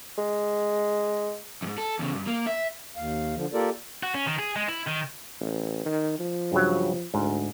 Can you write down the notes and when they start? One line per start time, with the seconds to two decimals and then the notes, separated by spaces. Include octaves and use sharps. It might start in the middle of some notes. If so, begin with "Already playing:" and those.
0.18 G#3
1.62 F2 G#2
1.78 A4
1.99 E2 C#3
2.15 G2
2.27 A#3
2.47 E5
2.96 D#2 F5
3.35 D3 F3
3.53 A#3 F4 G4 A4 A#4 D5
4.03 F#4
4.14 C#4
4.26 D#3
4.39 G#4
4.56 G#3
4.68 E4
4.87 D#3
5.40 A1
5.85 D#3
6.19 F3
6.52 G2 C#3 F#3
7.14 D2 G#2